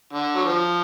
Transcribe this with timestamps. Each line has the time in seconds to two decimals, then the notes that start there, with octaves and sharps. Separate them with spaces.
0.13 D3
0.36 F#3
0.45 F3